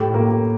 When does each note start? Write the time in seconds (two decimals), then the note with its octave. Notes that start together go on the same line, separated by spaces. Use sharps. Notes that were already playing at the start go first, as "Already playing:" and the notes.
Already playing: A2 G4
0.14 A#3